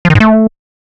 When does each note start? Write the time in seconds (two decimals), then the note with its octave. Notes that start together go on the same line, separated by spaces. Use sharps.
0.05 F3
0.10 D#3
0.15 G#2
0.20 A3